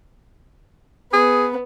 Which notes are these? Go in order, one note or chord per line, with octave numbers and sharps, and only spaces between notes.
B3 G#4